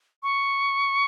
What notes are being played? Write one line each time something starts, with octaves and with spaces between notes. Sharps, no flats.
C#6